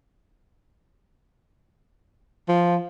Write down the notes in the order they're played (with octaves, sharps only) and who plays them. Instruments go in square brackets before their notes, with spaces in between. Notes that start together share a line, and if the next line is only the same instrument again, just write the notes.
[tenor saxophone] F3